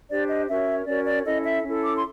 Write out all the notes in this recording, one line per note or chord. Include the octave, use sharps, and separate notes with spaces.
D4 G4 C5 D5
D#5
C#4 F#4 A#4 C#5 E5
C#4 F#4 A#4 C#5 D5
D5
C#4 E4 A4 D#5
E5
C#4 E4 A4
D6
C6